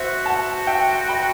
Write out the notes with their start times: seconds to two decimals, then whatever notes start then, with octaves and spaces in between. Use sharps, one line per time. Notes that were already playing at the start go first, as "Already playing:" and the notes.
Already playing: F#4 C5 E5
0.26 F#5 A5
0.67 E5 G5
1.08 G5 B5